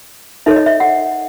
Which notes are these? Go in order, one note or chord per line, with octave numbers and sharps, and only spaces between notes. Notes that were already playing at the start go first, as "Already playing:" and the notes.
D#4 A4 C#5 E5
D#5
E5
F#5